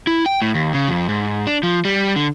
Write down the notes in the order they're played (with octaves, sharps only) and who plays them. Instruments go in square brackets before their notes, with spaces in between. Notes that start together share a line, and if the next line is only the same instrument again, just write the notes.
[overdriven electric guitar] E4
G5
A2
D#2
C#3
F2
G#2
D4
F3
G3
D3